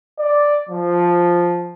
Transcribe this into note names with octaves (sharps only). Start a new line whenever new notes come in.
D5
F3